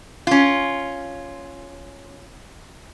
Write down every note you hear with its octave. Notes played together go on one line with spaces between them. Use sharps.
C#4 F4